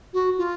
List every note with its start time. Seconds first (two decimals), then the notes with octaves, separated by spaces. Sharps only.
0.14 F#4
0.38 F4